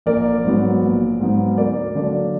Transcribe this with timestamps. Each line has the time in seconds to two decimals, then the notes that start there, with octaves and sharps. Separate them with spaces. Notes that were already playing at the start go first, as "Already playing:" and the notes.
0.06 A#1 A#4 D5
0.44 G#2 F#3 B3
0.82 A#1
1.20 G#2 F#3 B3
1.58 D2 A#4 D5
1.95 D3 F#3 A#3 D4